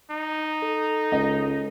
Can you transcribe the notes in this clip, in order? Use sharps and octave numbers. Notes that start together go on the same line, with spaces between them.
D#4
A4
C#2 D#5